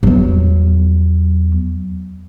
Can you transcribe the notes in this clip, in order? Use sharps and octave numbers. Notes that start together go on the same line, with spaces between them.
E2 F#3